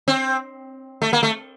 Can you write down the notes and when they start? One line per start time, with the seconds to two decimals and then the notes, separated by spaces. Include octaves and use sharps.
0.08 C4
1.02 A3
1.13 A#3
1.23 A3